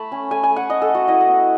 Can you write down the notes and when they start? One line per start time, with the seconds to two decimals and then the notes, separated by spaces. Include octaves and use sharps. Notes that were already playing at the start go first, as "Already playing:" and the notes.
Already playing: A3 A5 B5
0.12 C#4
0.31 A3 G#5
0.43 G#5
0.50 A3
0.56 F#5
0.69 A3 D#5
0.82 A4
0.89 A3
0.95 F#4
1.07 E4 D#5
1.20 F#5
1.27 B3